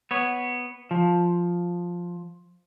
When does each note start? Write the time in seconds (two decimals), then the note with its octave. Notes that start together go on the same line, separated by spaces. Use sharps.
0.11 B3 C#5
0.91 F3